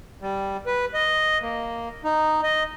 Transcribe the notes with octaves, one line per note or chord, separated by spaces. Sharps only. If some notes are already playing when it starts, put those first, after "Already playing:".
G3
B4
D#5
A#3
D#4
D#5